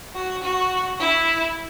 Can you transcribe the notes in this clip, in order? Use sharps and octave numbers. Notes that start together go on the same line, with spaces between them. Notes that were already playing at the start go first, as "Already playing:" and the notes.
F#4
F#4
E4